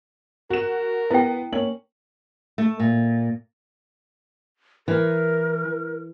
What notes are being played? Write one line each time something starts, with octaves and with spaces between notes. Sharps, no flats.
F#4 A#4 E7
B3 E4 G5
A#3 C#4 F#7
A3
A#2
E3 A#4